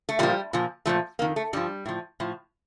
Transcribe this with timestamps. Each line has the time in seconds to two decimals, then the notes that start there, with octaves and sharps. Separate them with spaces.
0.09 A3
0.19 A#2 F3 G3
0.53 A#2 F3
0.86 A#2 F3 A3
1.19 F2 D#3 A#3
1.36 A3
1.53 G2 F3 G3
1.86 A2 F3
2.20 A2 F3